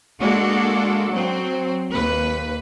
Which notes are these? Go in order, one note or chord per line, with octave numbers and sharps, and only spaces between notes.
G#3 A#3 D4 F#4 A4
F#3 C4
D#2 B4